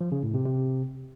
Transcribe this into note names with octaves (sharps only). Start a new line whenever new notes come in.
F3
C#3
A2
C3
C3